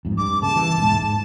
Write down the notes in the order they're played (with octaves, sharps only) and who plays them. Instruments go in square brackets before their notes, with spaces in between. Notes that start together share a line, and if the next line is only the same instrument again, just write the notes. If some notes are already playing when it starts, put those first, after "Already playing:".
[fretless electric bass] F2 G#2
[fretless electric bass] G2 [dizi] D6
[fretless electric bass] C#3 A#3 [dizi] A5
[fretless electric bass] E3
E1 G#2
G#2